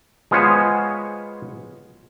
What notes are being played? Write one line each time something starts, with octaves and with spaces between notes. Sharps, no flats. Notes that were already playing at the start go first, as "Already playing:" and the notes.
G#3 B3 F4 C5 C#5 G#5